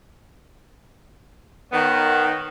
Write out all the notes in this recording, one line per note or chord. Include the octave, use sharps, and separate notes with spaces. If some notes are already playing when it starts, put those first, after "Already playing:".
D#3 B3 C#5